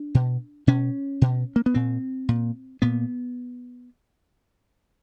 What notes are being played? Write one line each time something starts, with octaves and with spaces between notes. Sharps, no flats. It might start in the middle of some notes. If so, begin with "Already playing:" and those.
Already playing: D4
B2
B2 C#4
B2
A#3
B3
A#2 C4
A#2
A#2 B3